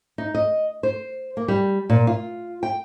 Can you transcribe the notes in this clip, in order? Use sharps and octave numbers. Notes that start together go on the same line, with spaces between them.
D#4
D#5
C5
A#3
G3
A#2
F4
G5